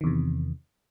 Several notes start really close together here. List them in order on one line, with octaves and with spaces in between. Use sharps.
D#3 E2 C3